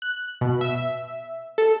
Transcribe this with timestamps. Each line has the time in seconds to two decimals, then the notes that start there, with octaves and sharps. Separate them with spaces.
0.02 F#6
0.41 B2
0.61 E5
1.58 A4